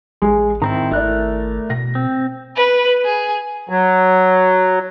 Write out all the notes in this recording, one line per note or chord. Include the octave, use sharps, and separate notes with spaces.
A1 G#3 G#4
G#2 D#3 C4 E4 A#5
G#1 A3 E4 A#4 D5 F#6
B2 A#6
C4
B4
G#4
F#3